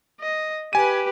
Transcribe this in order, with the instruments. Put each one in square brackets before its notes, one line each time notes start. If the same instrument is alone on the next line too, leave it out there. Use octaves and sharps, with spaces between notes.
[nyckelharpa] D#5
[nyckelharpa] G4 B4 [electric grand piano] G#5 D#7